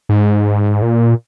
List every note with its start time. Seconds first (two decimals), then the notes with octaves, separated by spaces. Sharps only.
0.09 G#2
0.82 A#2